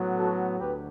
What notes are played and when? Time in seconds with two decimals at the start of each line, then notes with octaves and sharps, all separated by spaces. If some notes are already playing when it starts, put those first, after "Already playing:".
Already playing: A2 F#3 B3
0.18 F#4 A4
0.60 D2 G4 B4